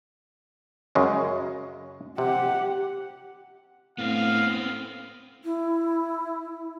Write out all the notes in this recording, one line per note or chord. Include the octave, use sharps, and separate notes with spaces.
F#2 C#3 G#3
C3 G4 F#5
A2 B3 C4 F5
E4